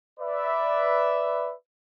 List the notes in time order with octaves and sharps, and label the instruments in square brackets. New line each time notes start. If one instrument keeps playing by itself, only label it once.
[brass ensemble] B4 D5 E5